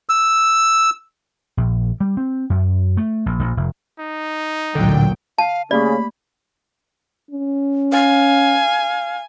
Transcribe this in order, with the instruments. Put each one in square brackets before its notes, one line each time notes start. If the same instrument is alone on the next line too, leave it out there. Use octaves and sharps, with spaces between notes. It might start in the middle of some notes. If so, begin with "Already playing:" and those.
[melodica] E6
[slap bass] A#1
G3
C4
F#2
A3
A#1
A#1
F1
[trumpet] D#4
[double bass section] A1 D2 A#2 [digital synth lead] D3 [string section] F#3 G5
[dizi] F5 [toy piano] A5
[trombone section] C#3 [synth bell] A3 A#3 G4 [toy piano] D5 [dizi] B5
[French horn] C#4
[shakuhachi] F5 [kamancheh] G#5